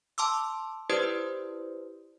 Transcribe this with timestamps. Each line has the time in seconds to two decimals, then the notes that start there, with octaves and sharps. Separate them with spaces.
0.18 A5 C6 D6 E6
0.90 E4 G4 B4 C5 D5 D#6